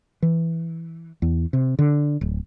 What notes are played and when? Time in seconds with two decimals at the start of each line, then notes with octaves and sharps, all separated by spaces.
0.22 E3
1.22 E2
1.53 C3
1.79 D3
2.21 D1